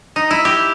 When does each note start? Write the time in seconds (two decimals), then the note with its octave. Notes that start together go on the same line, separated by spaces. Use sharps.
0.16 D#4
0.31 E4
0.45 G4